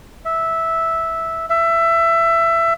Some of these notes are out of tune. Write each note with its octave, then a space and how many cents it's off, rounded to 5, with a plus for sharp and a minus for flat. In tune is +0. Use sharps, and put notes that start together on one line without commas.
E5 -10
E5 +20